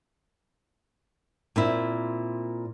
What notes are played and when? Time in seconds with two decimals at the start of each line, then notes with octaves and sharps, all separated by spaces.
1.56 A#2 C4 E4